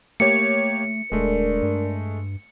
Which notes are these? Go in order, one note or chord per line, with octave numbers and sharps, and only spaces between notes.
A3 A#3 G4 C#5 C#7
D#1 G#3 A3 D4 A#4 D5
G2